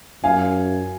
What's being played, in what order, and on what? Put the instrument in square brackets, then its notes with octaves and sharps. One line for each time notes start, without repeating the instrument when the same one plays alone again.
[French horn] F#2 [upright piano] F5 G#5